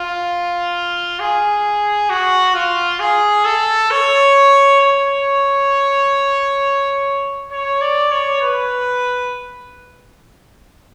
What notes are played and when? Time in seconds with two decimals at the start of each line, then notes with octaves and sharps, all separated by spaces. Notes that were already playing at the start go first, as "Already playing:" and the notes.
Already playing: F4
1.19 G#4
2.10 F#4
2.55 F4
3.00 G#4
3.45 A4
3.90 C#5
4.80 C#5
7.51 C#5
7.81 D5
8.11 C#5
8.42 B4